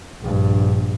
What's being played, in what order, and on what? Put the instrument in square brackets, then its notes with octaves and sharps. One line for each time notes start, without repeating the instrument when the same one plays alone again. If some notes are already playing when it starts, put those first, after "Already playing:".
[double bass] A#1 G2